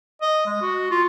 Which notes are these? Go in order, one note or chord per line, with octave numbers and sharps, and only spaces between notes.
D#5
G#3
F#4
F4